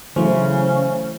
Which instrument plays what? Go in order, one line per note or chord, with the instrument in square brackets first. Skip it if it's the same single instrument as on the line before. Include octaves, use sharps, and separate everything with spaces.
[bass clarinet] C#3 [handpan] E3 E4 [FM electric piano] F#3 A3 C5 [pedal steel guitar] C#4